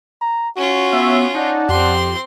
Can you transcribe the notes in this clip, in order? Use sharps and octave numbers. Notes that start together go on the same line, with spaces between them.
A#5
C#4 F4 F#4
B3 C#5 E5
D#4 D5 F#5 A5
F2 C4 G4 C6